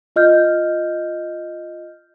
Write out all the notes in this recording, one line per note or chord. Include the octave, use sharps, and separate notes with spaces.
F4 D#5 F6 G6